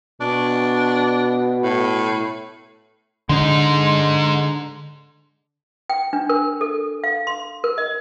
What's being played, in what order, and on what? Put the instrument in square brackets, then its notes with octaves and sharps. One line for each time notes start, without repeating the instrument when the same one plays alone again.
[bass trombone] B2 [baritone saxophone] D4
[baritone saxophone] A2
[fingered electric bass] D3 D4 [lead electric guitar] G#3 D#4 [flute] C6
[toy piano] G5
D4
A#4
A4
F5
C6
A#4
D#5